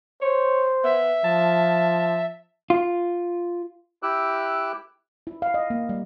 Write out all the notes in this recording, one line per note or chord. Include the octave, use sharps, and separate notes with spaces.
C5 C#5
B3 E5
F3 A5
F4
E4 G4 D6 E6 F#6
E4
F5
D#5
A#3
G3